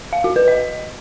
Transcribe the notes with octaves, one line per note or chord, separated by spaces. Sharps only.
F5
F#4
B4
D#5